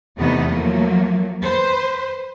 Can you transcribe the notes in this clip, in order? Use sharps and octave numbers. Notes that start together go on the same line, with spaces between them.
E2 C3 A3 B3 D#4 D#5
F3 F#3 A3 A#3
B4 C5